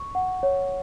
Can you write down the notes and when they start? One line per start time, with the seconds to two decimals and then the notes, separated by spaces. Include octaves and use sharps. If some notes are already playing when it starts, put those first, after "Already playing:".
Already playing: C#6
0.15 F#5
0.43 C#5